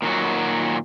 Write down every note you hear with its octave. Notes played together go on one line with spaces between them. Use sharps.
A#2 D#3 F#3 F#4